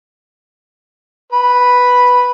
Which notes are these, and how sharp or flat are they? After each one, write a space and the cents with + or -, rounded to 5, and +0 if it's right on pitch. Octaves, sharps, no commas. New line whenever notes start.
B4 +0 B5 +0